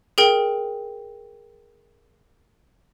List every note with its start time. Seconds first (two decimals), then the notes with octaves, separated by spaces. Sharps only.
0.18 G#4 A#4 G5